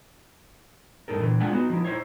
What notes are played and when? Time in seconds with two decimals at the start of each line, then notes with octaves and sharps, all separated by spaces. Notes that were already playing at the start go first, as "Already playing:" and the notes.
1.08 G2 D#4 A4 A#4
1.20 A#2 D3 E3
1.40 G#3 D4 F4 F#5 G#5
1.52 B3 D#4 F#4
1.70 F3 D#4 E4
1.84 D#4 E4 C5 C#5